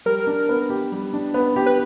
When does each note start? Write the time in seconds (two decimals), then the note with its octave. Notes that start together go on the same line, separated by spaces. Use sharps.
0.06 G3 A#4
0.27 D4
0.49 B3
0.70 G4
0.92 G3
1.13 D4
1.34 B3
1.56 G4
1.66 B4